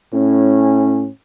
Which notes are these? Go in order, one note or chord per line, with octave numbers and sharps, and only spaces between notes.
A2 C#4